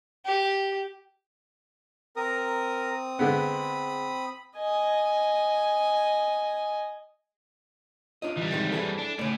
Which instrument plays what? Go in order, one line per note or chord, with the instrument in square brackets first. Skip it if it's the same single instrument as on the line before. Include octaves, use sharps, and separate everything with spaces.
[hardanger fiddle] G4
[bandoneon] C4 D#6 [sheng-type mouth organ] A#4
[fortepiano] D3 G#3 B3 [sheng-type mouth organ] B5
[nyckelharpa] D#5 G#5
[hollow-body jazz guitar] D4 F4 D#5
[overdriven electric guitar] E3 G3
[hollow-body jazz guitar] C3 D#3 G#3
E4 G#4 A4
[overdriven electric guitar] D4
[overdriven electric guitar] A2 [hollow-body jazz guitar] C#3 D5